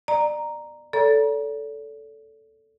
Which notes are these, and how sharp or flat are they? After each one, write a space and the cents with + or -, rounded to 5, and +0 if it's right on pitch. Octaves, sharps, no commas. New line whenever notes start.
D5 +30 A#5 +0
A4 +0 D5 -45 A#5 +30